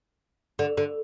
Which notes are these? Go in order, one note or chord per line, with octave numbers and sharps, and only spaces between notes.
D3
D3